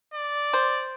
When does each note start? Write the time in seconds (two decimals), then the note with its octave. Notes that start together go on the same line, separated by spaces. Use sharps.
0.14 D5
0.53 C5